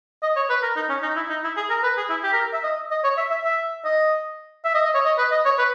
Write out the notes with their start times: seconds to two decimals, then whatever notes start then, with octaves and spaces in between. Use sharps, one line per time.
0.23 D#5
0.36 C#5
0.50 B4
0.63 A#4
0.76 D#4
0.90 C#4
1.02 D#4
1.16 E4
1.30 D#4
1.44 E4
1.57 G#4
1.70 A#4
1.83 B4
1.97 G#4
2.10 E4
2.24 G4
2.33 A#4
2.53 E5
2.64 D#5
2.91 D#5
3.04 C#5
3.17 E5
3.30 E5
3.44 E5
3.85 D#5
4.65 E5
4.75 D#5
4.85 D#5
4.95 C#5
5.05 D#5
5.18 B4
5.32 D#5
5.45 C#5
5.59 B4